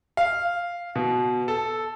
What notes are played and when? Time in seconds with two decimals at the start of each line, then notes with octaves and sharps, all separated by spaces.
0.17 F5
0.95 B2
1.48 A4